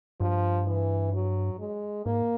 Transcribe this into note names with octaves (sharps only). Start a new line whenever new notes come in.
G2 F3
E3
F#3
G#3
G#2 A#3